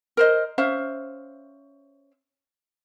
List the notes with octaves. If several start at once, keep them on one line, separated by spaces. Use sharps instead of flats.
A#4 C5 D#5
C#4 C5 E5 F5